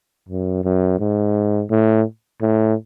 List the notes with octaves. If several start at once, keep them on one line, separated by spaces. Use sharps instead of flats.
F#2
F#2
G#2
A2
A2